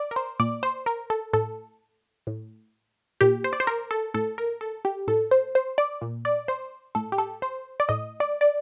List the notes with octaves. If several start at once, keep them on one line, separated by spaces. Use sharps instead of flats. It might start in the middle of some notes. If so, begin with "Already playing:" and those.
Already playing: D5
A#4
C5
A#2 D5
C5
A#4
A4
A2 A4
A2
A#2 G4
C5
D5
C5
A#4
A4
A2 A4
A#4
A4
G4
A2 A4
C5
C5
D5
A#2
D5
C5
A2 A4
G4
A4
C5
D5
A2 D#5
D5
D5